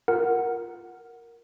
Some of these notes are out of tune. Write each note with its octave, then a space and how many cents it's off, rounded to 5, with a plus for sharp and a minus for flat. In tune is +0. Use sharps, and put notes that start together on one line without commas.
F4 +0 A#4 +0 F#5 +0